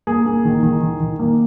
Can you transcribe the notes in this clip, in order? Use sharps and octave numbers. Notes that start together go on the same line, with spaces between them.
A#3 G#4
A#3
D#3
D#3
D#3
D#3
A#3